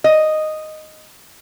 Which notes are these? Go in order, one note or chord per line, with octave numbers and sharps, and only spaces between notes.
D#5